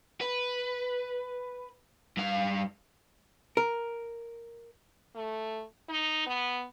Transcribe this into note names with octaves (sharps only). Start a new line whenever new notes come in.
B4
G2 F5
A#4
A3
D#4
B3